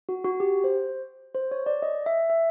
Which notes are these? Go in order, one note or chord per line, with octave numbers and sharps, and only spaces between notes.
F#4
F#4
G4
C5
C5
C#5
D5
D#5
E5
E5